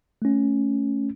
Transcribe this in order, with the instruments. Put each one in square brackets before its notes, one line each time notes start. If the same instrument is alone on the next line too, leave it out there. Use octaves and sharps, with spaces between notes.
[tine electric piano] A3 C#4